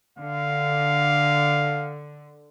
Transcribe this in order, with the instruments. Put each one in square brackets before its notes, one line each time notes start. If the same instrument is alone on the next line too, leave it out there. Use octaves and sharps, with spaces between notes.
[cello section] D3 [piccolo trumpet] F5